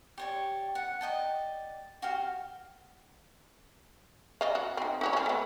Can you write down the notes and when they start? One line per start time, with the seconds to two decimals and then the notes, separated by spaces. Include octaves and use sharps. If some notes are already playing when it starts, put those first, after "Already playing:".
0.18 G4 C#5 D5
0.75 F#5
1.01 D5 D#5 G5 A5
2.02 F#4 G4 F5
4.41 D5 D#5 F5
4.55 F#4
4.77 C4 D#4
5.01 D#4 F#4 C#5
5.13 C4 C#4
5.26 A3 B3